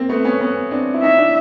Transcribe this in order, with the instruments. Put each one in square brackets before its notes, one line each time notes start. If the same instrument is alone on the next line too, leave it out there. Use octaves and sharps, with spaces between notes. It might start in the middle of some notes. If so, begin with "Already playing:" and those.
Already playing: [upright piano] A#3 C4
A3 B3
B3 C#4
B3 C#4
C4 D4
E4
[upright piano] C#4 D#4 [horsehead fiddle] E5
[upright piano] D4 E4